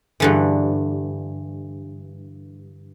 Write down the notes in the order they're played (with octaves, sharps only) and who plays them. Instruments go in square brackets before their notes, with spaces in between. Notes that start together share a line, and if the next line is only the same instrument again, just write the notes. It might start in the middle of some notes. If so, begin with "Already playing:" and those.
[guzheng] G2 D3 E3